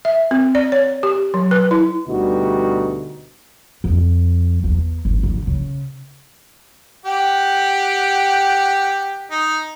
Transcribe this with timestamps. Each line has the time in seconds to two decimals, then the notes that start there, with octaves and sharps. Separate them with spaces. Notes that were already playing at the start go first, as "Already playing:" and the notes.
0.05 E5
0.31 C4
0.55 D5
0.72 C#5
1.03 G4
1.34 F#3
1.51 B4
1.71 E4
2.08 D2 B2 G3 D#4 F#4
3.84 F2
4.64 E2
5.05 G#1
5.23 D3
5.47 C#3
7.06 G4 F#5 G5
9.31 D#4